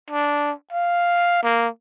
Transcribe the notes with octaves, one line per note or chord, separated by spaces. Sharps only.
D4
F5
A#3